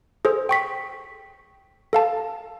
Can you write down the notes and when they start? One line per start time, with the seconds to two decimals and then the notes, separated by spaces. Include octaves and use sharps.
0.25 G#4 A4 C5
0.49 G5 C#6 B6
1.93 A4 F5 A5